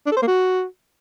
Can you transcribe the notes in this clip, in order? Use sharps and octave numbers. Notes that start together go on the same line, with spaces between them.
D4
A4
C5
A#3
F#4